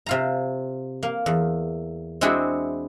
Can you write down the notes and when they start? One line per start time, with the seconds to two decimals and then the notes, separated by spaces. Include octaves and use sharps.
0.06 C3 F4 A#5
1.03 A#3
1.26 E2
2.21 G#3 C4 D4 E4 F#4 G#4